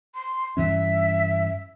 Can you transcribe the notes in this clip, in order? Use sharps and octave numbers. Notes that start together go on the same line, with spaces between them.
C6
G2 E3 C#4 E5